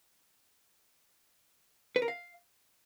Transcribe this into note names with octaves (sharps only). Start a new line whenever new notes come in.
B4
A#4
F5